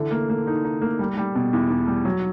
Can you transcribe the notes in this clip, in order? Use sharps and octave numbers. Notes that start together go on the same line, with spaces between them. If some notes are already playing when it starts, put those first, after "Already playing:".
Already playing: D3 E3
A#3
A#3
D#4
D#4
A#3
G3
G3
B2
E2
E2
G3
F#3